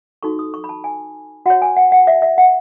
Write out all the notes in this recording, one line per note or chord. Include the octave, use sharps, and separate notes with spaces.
D#4 F#4 A4 C#6
D#6
C#6
B5
A5
G#5
F#4 C#5 F#5
G#5
F#5
F#5
E5
E5
F#5